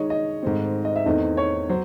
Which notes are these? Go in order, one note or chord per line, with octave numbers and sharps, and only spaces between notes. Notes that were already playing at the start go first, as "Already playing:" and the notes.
Already playing: D#3 G#3 D#4 C#5 D#5
D#5
G#2 D#3 A3 C4
D#5
E5
E2 D#3 A3 C4 D#4 D#5
C#5
F#3 C5